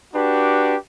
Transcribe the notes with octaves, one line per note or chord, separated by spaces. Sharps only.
D4 F#4 G4 B4